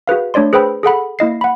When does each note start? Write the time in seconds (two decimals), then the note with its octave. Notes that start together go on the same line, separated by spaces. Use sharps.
0.07 F#4 G#4 B4 F5
0.34 A3 D4 C#5 D5 C6
0.53 G#4 B4 C5 G5 B5 E6
0.83 G#4 A4 F#5 B5
1.19 A#3 E4 D#5 C7
1.41 F#5 B5